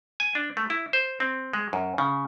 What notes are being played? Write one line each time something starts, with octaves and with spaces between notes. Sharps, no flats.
G#5
D4
A3
E4
C5
C4
G#3
F#2
C#3